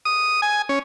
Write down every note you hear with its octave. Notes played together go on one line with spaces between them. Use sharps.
D#6
G#5
C#4